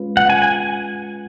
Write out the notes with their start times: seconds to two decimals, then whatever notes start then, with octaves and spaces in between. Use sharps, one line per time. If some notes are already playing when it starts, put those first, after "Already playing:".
Already playing: G#3 C#4 F4 B4
0.17 F#5
0.30 G#5
0.42 G#5